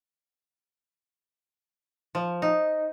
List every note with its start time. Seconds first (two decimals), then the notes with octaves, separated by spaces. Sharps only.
2.15 F3
2.42 D#4